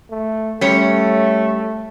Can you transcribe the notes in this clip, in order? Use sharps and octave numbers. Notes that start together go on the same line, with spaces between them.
A3
G3 A3 C#4 C#5